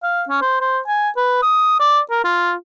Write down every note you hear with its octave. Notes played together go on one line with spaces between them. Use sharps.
F5
C#4
C5
C5
G#5
B4
D#6
D5
A#4
F4